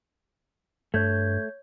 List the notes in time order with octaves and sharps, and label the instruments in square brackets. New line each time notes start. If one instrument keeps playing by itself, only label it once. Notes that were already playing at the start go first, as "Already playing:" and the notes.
[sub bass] G2 [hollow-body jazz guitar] A3 [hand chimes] C#5 G6 G#6